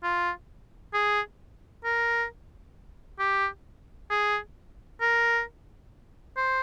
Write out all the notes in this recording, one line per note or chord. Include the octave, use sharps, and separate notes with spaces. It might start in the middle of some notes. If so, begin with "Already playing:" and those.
F4
G#4
A#4
G4
G#4
A#4
C5